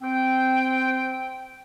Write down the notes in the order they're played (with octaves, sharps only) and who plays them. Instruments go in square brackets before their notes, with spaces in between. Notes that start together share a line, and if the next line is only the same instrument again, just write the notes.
[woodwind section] C4 G5